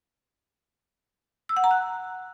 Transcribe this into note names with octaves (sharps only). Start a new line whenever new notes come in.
E6
F#5
A#5
F#6